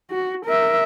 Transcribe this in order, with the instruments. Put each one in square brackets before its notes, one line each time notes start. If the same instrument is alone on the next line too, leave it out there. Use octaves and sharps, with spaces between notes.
[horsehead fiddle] F#4
A#4 E5